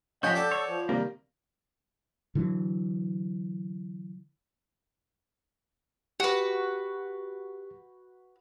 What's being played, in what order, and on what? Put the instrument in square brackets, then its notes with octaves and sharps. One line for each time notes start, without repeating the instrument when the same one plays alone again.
[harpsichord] F3 C#5 [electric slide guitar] C#4 G4 [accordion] D#5 F#5 G5 [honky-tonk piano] G6
[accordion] A4 [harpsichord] D5 F#5 A5
[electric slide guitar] C#5
[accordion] F3
[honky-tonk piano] C3 D#3 G3 [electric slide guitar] A#3
[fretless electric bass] D3 E3 F#3
[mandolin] F#4 B4 [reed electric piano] G4